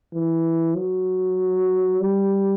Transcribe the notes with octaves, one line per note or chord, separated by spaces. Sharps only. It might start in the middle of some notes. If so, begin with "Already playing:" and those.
E3
F#3
G3